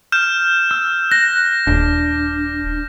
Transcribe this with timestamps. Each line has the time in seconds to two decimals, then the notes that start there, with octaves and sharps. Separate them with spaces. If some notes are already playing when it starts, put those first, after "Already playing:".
0.12 F6 G6 E7
0.71 E6
1.12 F#6 A#6
1.67 D#1 D4